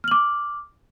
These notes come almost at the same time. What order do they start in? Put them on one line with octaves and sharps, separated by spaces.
F6 F#7 D6